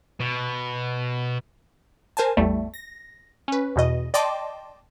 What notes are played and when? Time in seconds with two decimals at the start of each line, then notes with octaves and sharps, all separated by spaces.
0.20 B2
2.17 A#4 C5 G#5 A5
2.37 A1 E2 G3 A3
2.74 A#6
3.48 C#4 B4
3.76 E2 B2 D#5
4.14 D5 D#5 G5 A5 C6 D6